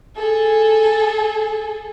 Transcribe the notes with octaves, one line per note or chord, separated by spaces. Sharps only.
G#4 A4